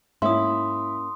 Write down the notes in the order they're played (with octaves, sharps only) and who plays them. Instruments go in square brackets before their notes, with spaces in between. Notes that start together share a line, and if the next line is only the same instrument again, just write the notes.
[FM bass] G#2 [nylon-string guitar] A#3 C#4 [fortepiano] E4 E5 [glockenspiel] C6 D#6